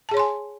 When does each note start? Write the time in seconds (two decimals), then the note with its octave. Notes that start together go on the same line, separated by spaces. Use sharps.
0.09 A5
0.11 G#4
0.14 C#5
0.17 C6
0.19 G#5